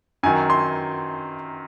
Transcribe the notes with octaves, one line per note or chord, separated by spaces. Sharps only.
F#2 D#3 F#3 G#5
C6